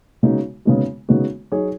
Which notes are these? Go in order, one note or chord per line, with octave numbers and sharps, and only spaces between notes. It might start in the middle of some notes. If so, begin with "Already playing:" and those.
C#3 G#3 B3 D#4 F#4
C#3 G#3 B3 D#4 F#4
C#3 G#3 B3 D#4 F#4
F#3 D#4 G#4 C#5